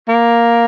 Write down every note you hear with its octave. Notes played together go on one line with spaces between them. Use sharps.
A#3